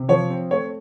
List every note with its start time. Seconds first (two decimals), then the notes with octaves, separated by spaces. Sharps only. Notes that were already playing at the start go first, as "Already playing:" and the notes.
Already playing: C3
0.09 F3 C#5
0.30 C4
0.51 A3 C#5